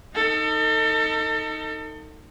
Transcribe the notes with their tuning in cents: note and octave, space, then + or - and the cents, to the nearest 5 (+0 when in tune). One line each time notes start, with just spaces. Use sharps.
D#4 +5 A4 +35